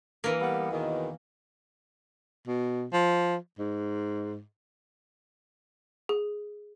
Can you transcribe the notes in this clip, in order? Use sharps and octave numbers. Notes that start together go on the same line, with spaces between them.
E3 A#3
G3 B3
E2 B2 D#3
B2
F3
G#2
G#4